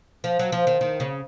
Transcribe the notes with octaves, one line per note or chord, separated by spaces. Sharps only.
F3
F#3
F3
D#3
D#3
C#3